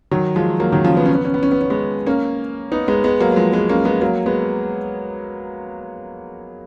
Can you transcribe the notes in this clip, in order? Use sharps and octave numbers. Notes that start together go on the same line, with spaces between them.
D#3 F#3
F3 G#3
F#3 A#3
D#3 F#3
C#3 F3
B3
C#4
B3
C#4
B3
C#4
B3
C#4
G#3 B3
A#3 C#4
B3 D#4
G#3 B3
G#3 B3
F#3 A#3
F#3
F3 G#3
G#3 B3
A#3 C#4
G#3 B3
F#3 A#3
G#3 B3